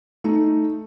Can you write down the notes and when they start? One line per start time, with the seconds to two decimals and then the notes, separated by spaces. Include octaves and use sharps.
0.24 A3 D#4